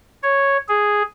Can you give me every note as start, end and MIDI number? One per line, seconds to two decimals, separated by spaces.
0.23 0.57 73
0.68 1.02 68